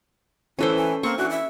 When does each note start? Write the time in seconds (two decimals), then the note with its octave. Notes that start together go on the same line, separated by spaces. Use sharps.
0.59 A2 E3 C#4 E4 A4 C5
0.76 G#5
1.03 A#3 C4 C#6
1.18 E3 D4 F#4
1.30 E5